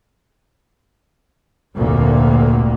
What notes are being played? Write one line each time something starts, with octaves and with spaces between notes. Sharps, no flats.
F1 D2 A#2 D3 A#3